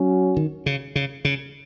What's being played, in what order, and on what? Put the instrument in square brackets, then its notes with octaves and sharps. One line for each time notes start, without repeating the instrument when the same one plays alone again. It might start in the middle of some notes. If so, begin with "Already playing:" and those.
Already playing: [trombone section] F#3 C#4 F#4
[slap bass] D#3
C#3
C#3
C#3